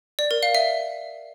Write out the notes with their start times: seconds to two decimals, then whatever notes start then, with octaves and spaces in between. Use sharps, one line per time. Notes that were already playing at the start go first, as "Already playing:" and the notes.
0.19 D5
0.31 A#4
0.43 F5
0.55 E5